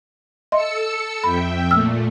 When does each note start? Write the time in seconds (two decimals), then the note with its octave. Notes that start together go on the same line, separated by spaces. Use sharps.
0.52 A4 D#5 E5 C6 E6 C#7
1.24 F2 E5 G5 B5
1.71 A#2 A3 E6 F6